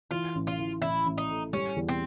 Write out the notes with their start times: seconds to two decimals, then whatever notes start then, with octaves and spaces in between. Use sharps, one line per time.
0.11 E3 F4
0.35 A1
0.47 F4
0.59 E3
0.82 A1 E4
1.06 A1
1.18 D#4
1.30 A2
1.53 G3 C#4
1.76 E2
1.88 C4